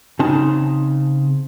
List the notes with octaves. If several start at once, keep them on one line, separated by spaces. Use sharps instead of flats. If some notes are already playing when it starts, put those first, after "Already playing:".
C#3 C4 D#4 A5